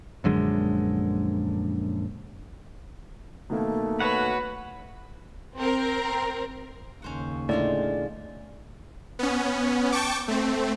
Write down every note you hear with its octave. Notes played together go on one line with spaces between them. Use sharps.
A#1 F#2 D3 G#3
B2 D#3 A3 A#3
F#4 B4 C#5 F#5
C4 A#4
D#2 C#3 C#4 C5 F#5
A2 D3 D#3 G#3 F4 D5
B3 C#4
G5 A5 C#6 D6
A3 C4